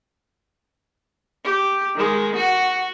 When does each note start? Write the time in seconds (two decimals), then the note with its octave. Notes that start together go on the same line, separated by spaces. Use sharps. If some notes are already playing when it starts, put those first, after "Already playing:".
1.44 G4
1.95 D#3 G#3
2.35 F#4